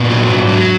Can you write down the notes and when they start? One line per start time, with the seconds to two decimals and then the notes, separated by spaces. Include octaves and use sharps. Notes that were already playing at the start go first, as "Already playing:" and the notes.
Already playing: A#2 B3 B4
0.09 F#3
0.29 G#2
0.47 F#3